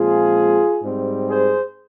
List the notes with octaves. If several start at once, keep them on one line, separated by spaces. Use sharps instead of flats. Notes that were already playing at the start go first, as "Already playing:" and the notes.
Already playing: A#2 F3 G#3 C4 F4 G#4
G#2 G3 C4
G#4 C5